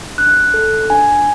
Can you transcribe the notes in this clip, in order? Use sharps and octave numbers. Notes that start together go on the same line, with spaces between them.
D4 F#6
A4
D4 G#5